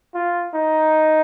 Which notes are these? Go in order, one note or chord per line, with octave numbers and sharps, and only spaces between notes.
F4
D#4